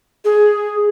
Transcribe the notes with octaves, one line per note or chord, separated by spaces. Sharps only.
G#4